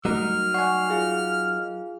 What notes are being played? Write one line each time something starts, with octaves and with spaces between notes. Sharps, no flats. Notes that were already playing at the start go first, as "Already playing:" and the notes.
F#3 G3 A3 D#4 A#4 F6
D5 F#5 G#5 C#6 C7
F4 G#4 F5